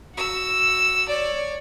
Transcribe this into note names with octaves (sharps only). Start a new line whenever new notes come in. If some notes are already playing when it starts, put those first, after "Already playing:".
F#4 E6
C#5 D5